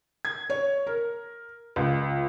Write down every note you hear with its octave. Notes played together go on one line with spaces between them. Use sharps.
G#6
C#5
A#4
C#2